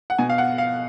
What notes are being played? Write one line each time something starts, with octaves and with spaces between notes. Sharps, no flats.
F#5
B2 G#5
F5
F#5
F5